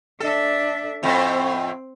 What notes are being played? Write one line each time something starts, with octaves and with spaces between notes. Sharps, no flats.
D4 A4 E5
F2 A2 C4